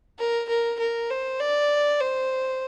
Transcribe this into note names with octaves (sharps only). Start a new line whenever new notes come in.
A#4
A#4
A#4
C5
D5
C5